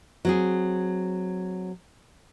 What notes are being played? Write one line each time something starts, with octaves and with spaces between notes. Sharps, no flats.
F#3 C4 G#4